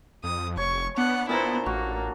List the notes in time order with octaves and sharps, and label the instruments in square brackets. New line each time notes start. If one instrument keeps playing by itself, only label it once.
[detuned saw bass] F2 [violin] D#6
[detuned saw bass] F1 [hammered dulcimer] C#5 [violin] C#6
[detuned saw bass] B3 [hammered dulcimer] D4 [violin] F#5
[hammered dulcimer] A#2 A4 A#5 [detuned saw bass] B3 [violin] E4 C5
[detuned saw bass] A1 [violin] A#3 [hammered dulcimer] F#4